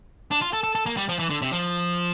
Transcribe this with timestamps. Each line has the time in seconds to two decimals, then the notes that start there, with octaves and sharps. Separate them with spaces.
0.31 D4
0.41 F4
0.53 A4
0.64 A4
0.75 A4
0.86 A#3
0.97 G3
1.09 F3
1.19 E3
1.30 D3
1.42 C3
1.52 F3